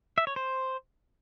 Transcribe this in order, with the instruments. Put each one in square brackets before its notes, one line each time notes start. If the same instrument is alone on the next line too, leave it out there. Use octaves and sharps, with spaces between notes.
[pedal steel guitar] E5
C#5
C5